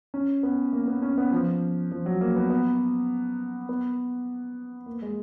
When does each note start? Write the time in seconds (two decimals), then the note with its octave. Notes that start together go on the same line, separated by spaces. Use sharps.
0.14 C#4
0.43 B3
0.73 A#3
0.88 B3
1.02 C#4
1.18 B3
1.32 F3
1.91 F3
2.06 F#3
2.21 A#3
2.36 B3
2.50 B3
3.69 B3
4.86 A#3
5.02 G#3